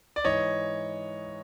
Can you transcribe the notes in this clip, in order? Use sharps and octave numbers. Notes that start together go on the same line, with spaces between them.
D5
G#2 E3 C#5 D#5